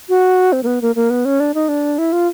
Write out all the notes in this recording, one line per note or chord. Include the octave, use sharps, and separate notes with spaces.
F#4
C4
A#3
B3
A#3
A#3
B3
C#4
D4
D#4
D4
E4
F4